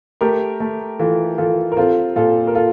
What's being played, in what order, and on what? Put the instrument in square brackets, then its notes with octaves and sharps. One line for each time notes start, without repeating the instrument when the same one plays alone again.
[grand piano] A3 [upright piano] G4 A#4
[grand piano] A3
[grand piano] E3 [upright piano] F4 A4
[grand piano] E3 [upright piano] F4 A4
[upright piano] A#4
[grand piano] C4 [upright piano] F4 A4
[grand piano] A#2 [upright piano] F4 A4
[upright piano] A#4
F4 A4